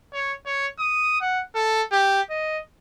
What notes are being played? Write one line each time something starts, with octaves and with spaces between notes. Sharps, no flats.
C#5
C#5
D#6
F#5
A4
G4
D#5